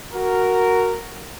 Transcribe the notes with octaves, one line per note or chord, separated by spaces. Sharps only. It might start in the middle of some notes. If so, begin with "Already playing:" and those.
F#4 A#4